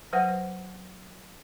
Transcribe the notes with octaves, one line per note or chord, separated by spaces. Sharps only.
F#3 B4 C5 F#5